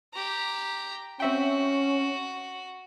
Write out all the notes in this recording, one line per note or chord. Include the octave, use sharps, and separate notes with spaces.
G4 A#5
C4 C#4 F#4 E5 G5